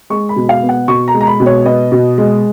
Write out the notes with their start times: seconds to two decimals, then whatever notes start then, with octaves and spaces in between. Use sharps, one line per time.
0.10 G#3 C#6
0.29 B5
0.36 B2
0.49 F5
0.63 B3
0.69 F#5
0.88 B2 C#6
1.08 A#5
1.14 G#3
1.21 A#5
1.27 B5
1.40 B2
1.46 C#5
1.65 B3 D#5
1.92 B2
2.18 G#3